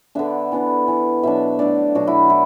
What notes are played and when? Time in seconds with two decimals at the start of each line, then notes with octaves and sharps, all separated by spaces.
0.15 D3 B3 D4 E5
0.52 E3 B3 D4
0.88 E3 D4
1.23 B2 F#3 D4 E5
1.59 D3 A3 D4 D5
1.95 B2 F#3 D4 F#4
2.07 E4
2.30 E4